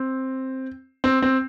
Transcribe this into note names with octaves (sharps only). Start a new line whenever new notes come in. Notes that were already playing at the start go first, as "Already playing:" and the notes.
Already playing: C4
C4
C4